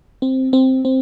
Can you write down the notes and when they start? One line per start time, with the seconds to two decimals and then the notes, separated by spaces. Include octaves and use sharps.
0.22 C4
0.53 C4
0.85 C4